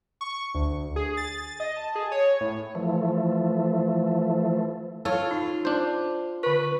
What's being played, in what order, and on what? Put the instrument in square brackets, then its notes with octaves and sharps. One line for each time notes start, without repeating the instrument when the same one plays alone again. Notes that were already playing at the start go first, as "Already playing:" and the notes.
[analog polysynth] C#6
D2
G#4
A6
D#5
A5
G#4
C#5
A2
[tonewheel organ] E3 F3 A3
[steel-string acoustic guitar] F4 [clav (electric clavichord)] A4 C#5
[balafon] D#4
[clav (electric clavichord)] D4 C5
[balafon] D3 C#6 [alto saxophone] B4